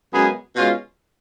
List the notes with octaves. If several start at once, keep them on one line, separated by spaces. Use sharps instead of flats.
F#2 C#3 G#3 B3 G#4
B2 G#3 C#4 F4